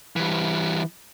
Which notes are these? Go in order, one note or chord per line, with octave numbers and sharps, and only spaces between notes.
E3 G3